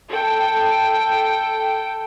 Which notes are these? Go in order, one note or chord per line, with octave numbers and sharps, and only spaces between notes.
A4 G5